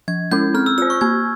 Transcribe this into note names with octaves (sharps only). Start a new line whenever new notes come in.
F3 G#6
G#3 C#4 E4 G6
C4 F6
E6
F4 C5 E6
C#6
A#3 G#6